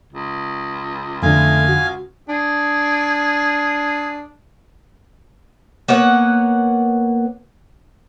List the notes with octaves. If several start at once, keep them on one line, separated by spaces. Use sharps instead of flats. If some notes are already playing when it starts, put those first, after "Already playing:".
C#2
F2 D3 A3 F5 G#5
F#4
D4 G#4
A#3 B3 C#5 F#5